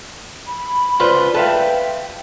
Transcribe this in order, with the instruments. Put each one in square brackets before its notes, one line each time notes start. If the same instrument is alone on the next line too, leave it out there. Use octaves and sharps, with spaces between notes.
[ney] B5
[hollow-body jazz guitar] C#2 D5 [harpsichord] F4 B4 C5
[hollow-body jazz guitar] A4 E5 F5 [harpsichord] B4 [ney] G5